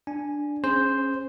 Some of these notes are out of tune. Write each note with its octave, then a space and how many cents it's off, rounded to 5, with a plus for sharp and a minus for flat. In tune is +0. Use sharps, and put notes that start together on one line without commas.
D4 +0 G#5 +0
C#4 -25 G#4 +0 C5 +0